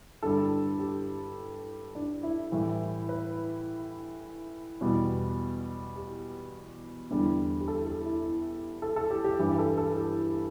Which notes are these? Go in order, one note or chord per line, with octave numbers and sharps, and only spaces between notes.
G2 D3 G3 A4
G4
D4
E4
A2 E3 G3
B4
E2 B2 G3
G4
E2 D3 G3
G4
A4
A4
E4
E4
A4
A4
G4
G4
G2 E3 G3 G4
A4
A4
G4